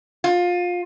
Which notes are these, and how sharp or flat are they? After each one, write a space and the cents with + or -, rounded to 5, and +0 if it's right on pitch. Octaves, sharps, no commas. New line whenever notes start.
F4 +20